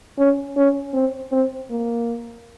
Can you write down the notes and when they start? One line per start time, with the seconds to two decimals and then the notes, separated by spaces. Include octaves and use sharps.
0.18 C#4
0.57 C#4
0.93 C4
1.32 C4
1.70 A#3